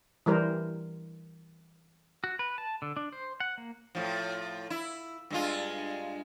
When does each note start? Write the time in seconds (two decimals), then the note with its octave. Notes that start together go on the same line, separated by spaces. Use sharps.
0.26 E3 G3 A#4 C5
2.24 F#4
2.39 B4
2.58 A5
2.82 D3
2.97 D4
3.13 C5
3.40 F#5
3.58 A#3
3.95 A2 F3
4.70 E4
5.30 G2 G#3 F4